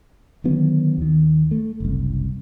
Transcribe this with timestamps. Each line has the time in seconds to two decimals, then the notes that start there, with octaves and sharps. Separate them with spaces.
0.44 D3 D#3 F#3 B3
0.98 D#2 D#3
1.51 A3
1.80 F#1 C2